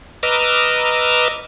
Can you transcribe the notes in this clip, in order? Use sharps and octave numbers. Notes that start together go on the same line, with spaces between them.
B4 D#5 A#5 D6 E6 F6